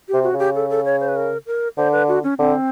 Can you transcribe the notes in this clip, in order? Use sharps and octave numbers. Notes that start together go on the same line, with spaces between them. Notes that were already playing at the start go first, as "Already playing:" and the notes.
G4
C3
F#4
C#3 G4
A4
A4
C#5
C5
B4
A#4
A#4
D3 C5
B4
F#4
C#4
D3 C4